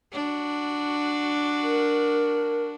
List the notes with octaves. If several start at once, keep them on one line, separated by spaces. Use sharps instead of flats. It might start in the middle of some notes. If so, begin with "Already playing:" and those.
D4 F#4
A#4